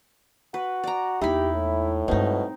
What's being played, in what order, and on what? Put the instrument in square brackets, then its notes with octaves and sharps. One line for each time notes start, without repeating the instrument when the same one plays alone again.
[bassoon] F#4 [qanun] B4
[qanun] D5 A#5
[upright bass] E2 A#3 [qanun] D#4 B5 [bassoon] E4 [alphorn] G4
[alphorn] A2
[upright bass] G2 G#3 [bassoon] B2 [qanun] C4 D#4